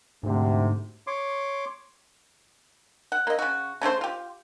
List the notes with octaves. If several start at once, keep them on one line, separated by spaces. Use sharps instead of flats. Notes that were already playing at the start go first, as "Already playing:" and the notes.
D2 G#2 C3
C#5 C6 D6
F#5
A#3 D#5
C#3 F#4
C#3 A3 F#4 C5
F4 G4